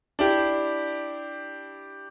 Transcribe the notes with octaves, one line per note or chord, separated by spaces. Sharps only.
D4 E4 G4